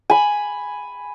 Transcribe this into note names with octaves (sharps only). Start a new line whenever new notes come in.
G#5 B5